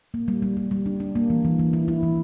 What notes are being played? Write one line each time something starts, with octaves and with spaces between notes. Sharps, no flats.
A#3
G3
G3
G3
G3
D4
D4
A#3
E3
E3
E3
E4
E4
E3